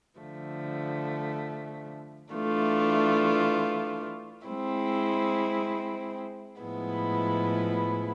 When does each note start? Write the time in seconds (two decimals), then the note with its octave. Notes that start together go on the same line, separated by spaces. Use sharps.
0.19 D3 F3 A3
2.33 E3 A3 D4 F4
4.47 G#3 C4 E4
6.61 A2 F3 G#3 B3 E4